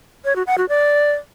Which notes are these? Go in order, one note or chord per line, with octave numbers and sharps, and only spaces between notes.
C#5
F#4
F#5
F#4
D5